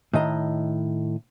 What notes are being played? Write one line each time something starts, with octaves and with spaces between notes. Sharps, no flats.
A2 D#3 D#5 A#5